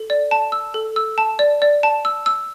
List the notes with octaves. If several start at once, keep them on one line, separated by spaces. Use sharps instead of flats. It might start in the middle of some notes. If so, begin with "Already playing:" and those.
Already playing: A4
D5
A5
E6
A4
E6
A5
D5
D5
A5
E6
E6